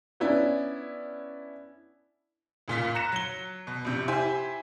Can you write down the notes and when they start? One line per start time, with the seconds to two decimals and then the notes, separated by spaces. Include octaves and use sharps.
0.20 B3 C#4 D4 E4 D5
2.68 A1 A#2 F4 B6
2.95 A#5 F#6 A#6 C#7 E7
3.12 F#3 G7
3.67 B2
3.85 A#1 C3
4.08 E4 G4 C5 G#5 C6